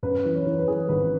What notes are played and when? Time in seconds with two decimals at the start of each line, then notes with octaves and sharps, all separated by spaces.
0.03 F#2 B4
0.25 E3
0.35 C#5
0.47 E3
0.59 B4
0.68 E3 G#4
0.89 G#1 B4